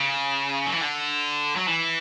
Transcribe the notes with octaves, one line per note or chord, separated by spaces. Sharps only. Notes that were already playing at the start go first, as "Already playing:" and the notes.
Already playing: C#3
F#3
E3
D3
F#3
E3